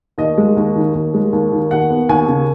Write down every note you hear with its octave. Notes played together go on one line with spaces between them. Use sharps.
D#2 D#5
G#3
D#2
D#3
D#2
G#3
D#2
D#3
D#2 F#5
B3
D#2 G#5
C#3